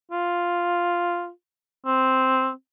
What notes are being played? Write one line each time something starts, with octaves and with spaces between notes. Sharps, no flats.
F4
C4